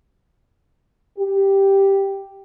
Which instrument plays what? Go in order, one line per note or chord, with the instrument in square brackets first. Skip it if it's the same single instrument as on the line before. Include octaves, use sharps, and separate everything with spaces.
[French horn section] G4